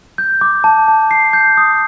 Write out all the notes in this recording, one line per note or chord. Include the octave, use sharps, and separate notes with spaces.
G6
D6
A5
A5
C7
G6
D#6